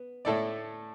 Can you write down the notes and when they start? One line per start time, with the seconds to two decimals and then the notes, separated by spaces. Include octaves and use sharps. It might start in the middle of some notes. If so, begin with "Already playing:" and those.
Already playing: B3
0.25 A2 A3 E4 A4 D5